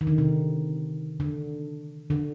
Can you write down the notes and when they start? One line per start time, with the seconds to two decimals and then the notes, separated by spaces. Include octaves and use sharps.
0.01 D#3
0.07 D3
0.18 C3
1.20 D3
2.10 D3